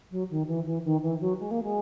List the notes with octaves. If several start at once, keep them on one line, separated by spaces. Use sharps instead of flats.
F#3
D#3
E3
E3
D#3
E3
F#3
G#3
A#3
G#3